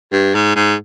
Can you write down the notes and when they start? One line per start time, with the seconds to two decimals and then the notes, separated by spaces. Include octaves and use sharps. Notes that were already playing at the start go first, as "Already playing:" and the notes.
0.12 G2
0.35 G#2
0.56 G#2